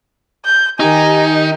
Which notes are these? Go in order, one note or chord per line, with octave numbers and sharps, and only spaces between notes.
G6
D#3 D#4 G4 G#5